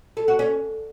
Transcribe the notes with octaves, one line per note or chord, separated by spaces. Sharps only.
A4
F#4
C#4